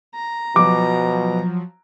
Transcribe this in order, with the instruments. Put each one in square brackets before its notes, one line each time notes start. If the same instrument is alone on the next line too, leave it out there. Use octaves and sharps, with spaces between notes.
[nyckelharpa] A#5
[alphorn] B2 [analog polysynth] F3 F#3 [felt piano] D6